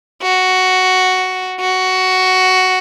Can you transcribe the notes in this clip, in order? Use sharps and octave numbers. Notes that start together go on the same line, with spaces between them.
F#4
F#4